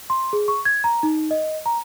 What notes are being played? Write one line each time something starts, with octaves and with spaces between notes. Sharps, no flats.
C6
G#4
C#6
G#6
A#5
D#4
D#5
A#5